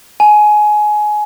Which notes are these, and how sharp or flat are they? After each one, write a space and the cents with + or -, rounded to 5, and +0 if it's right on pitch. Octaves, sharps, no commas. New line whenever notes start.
G#5 +20